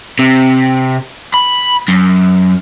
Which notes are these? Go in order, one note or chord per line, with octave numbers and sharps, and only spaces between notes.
C3
B5
F#2